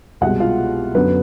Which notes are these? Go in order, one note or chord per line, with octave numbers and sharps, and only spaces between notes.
C2 B2 G#3 F#4 F#5
F4 F5
F#2 D3 F#3 B3 B4